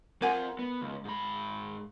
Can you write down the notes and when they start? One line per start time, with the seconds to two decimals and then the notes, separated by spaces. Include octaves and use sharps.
0.22 C4 F4 A#4 F#5 G#5
0.59 B3
0.82 C#2
1.05 G#2 B5